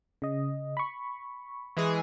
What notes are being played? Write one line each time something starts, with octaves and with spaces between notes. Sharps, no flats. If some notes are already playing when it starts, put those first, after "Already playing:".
C#3 D#5
B5 C#6
E3 G#3 G#4